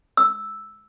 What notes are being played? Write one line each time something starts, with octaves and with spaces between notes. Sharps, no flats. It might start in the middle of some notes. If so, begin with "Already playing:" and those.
E6